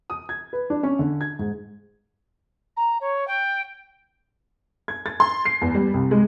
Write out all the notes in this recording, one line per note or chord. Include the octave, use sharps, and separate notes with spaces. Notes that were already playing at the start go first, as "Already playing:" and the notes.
D#6
G#6
B4
D4
C#4
D3
G#6
G#2
A#5
C#5
G5
G#6
A6
C6
C7
E2
G3
C2
G#3